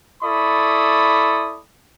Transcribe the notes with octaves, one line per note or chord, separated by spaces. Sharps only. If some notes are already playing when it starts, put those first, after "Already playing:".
E4 A4 D5 B5 C#6 D#6